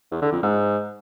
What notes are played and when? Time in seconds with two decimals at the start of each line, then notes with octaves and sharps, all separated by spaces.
0.12 E2
0.22 D3
0.33 F2
0.43 G#2